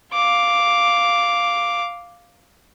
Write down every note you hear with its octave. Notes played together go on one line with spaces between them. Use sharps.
F5 D6